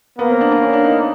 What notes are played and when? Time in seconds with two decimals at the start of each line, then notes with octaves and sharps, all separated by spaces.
0.19 A#3 B3
0.30 C4
0.41 D4
0.52 D4
0.62 C#4
0.73 D4
0.84 D#4